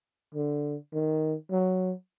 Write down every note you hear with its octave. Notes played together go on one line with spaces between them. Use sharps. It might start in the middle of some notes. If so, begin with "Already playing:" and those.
D3
D#3
F#3